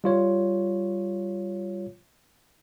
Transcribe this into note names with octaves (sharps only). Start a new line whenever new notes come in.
G3 F4 C#5